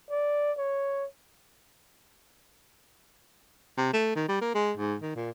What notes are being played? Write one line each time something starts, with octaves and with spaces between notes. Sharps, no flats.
D5
C#5
C3
A3
D#3
G3
A#3
G#3
G#2
D#3
A#2